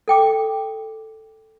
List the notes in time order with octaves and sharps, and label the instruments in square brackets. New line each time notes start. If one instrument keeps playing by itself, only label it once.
[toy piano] A4 G5 D6